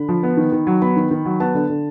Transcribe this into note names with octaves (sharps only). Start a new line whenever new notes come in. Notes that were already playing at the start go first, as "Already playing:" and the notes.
Already playing: D3 B5
F3
B3
D#3
D#3
F#3
B3 B5
D#3
D#3
F#3
B3 A5
D3
D3